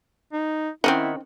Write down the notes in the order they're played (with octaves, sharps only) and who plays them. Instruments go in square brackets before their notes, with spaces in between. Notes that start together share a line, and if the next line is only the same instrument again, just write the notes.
[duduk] D#4
[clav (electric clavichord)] D#3 F#5 [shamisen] C4 C#4 D#4 [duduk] E4